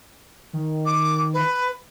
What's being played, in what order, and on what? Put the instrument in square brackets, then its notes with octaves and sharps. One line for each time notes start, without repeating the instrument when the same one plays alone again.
[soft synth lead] D#3
[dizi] D6
B4